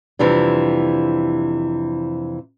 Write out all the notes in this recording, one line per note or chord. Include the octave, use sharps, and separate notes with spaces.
F2 C3 E3 G3 D4